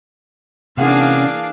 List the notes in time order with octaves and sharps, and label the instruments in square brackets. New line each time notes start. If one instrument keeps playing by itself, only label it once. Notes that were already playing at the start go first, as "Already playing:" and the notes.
[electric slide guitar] C3 F#5 [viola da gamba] E3 A#3 G#4 [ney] C#4 [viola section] D4 F5